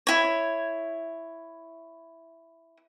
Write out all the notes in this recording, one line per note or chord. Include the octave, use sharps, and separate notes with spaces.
E4 C#5